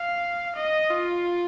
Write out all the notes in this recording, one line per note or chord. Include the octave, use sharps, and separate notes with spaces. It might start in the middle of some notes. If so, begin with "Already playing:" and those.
Already playing: F5
D#5
F4